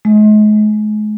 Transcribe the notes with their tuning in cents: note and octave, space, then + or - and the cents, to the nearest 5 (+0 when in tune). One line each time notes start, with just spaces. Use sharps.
G#3 +40